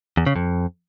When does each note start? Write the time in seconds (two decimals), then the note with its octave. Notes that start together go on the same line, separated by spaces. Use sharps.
0.17 E2
0.26 C#3
0.36 F2